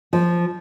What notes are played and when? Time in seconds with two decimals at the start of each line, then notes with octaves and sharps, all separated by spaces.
0.13 F3